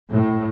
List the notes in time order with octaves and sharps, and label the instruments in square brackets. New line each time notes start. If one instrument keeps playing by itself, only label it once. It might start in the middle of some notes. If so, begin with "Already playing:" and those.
[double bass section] A2